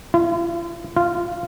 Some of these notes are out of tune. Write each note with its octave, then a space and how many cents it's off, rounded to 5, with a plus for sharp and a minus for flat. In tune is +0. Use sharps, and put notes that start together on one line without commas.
F4 -45
F4 -10